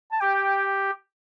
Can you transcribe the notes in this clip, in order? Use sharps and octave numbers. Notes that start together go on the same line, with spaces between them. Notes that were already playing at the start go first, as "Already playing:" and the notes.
A5
G4 G5